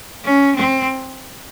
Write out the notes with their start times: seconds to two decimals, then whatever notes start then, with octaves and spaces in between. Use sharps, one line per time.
0.25 C#4
0.56 C4